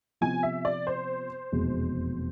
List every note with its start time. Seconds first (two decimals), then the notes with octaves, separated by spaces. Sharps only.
0.21 C3 F3 B3 F4 G#5
0.43 E5
0.65 D5
0.87 C5
1.52 F1 E2 B2 G#3